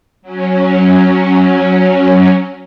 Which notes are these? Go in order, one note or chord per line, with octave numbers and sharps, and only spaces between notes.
F#3 C#4